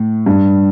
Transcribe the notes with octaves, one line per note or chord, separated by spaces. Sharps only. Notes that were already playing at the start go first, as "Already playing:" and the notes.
Already playing: A2
G2